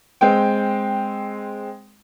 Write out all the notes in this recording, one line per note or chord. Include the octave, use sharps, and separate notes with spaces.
G#3 C4 G5